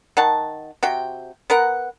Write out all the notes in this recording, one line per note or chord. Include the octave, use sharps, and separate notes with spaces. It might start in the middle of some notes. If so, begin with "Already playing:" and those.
D#3 F#5 A5
C3 F#4 G5
B3 A#4 F#5